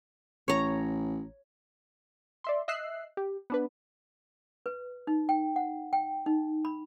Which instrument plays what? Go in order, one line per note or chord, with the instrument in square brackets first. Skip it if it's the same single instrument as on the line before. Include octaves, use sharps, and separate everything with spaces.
[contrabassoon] A1 [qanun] C#5 A#5
[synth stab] D5 E5 C6
D#5 E5 E6 F#6 C7
G4
B3 D4 B4
[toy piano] B4
D#4
G5
F#5
G5
D#4
B5